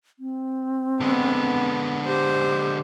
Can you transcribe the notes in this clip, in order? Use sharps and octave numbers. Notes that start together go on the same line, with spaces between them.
C4
D3 G#3 B3
G4 C5